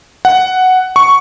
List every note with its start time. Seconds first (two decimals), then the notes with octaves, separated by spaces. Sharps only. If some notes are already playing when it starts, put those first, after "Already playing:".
0.25 F#5
0.96 C#6